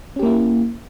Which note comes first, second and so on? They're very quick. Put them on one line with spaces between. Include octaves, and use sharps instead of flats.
C#4 G4 A#3 E4